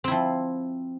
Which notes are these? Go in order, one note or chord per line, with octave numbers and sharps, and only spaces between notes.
F3 C4 E4